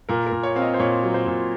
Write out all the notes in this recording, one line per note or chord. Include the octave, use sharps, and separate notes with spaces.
A#2 A#4
A#4
A#2
C#5
C4 F5
D#5
C5
A#2 C#5
F#3
C5
A#2